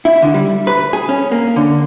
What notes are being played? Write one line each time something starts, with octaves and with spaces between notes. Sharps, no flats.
E4
D3
G3
B4
G#4
C#4
A#3
D3